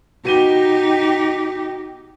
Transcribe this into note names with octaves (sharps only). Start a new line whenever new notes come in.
B2 D#4 G4 D#7 G7